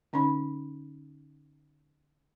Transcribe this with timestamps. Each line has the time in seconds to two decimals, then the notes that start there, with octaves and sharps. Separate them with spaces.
0.13 D3 C#4 D#4 B5